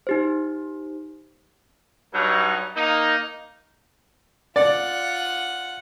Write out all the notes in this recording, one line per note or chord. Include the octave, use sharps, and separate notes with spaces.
D#4 G4 C5
G2 F#3 D#4
A#3 D#4
F4 D5 F#5